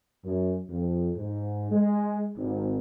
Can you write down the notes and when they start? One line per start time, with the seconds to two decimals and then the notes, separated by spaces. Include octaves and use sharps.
0.24 F#2
0.69 F2
1.16 G#2
1.71 G#3
2.36 G#1